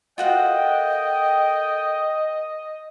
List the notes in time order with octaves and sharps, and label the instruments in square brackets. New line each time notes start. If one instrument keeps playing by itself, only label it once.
[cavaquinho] F4 F#4 F#5 [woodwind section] A4 A#4 G5 [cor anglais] D#5